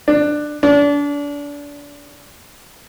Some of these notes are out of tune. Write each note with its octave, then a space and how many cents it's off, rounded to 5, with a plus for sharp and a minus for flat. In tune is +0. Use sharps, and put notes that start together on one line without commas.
D4 +15
D4 -30